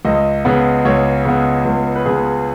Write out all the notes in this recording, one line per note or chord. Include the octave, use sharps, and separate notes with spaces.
C#2 D#5
C#3 B3
C#2 C#5
C#3 B3
C#2
B4
C#3 B3 G#4